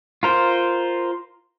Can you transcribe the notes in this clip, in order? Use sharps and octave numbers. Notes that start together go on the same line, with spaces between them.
F4 A#4 C5